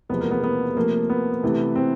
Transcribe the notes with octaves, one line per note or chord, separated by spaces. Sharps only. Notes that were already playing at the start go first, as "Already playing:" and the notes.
E2 C3 F3 G#3 B3
A#3
B3
B3
C3 F3 A3 A#3
B3
C3 E3 A3
C4